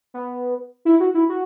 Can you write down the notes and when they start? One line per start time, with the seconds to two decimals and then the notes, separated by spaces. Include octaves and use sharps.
0.14 B3
0.85 E4
1.00 F#4
1.14 E4
1.29 F#4